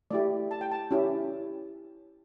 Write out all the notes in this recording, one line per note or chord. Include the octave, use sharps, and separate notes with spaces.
A3 E4 G4 D5
A5
G5
A5
C#4 E4 G4